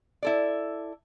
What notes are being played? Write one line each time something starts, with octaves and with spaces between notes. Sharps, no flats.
E4 A4 D5